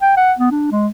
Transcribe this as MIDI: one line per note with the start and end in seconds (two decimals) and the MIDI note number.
0.02 0.13 79
0.17 0.33 78
0.39 0.51 59
0.51 0.67 62
0.71 0.88 56